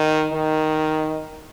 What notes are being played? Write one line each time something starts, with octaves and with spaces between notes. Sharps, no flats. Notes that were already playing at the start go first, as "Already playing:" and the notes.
Already playing: D#3
D#3